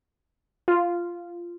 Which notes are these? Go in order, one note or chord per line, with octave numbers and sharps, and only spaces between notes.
F4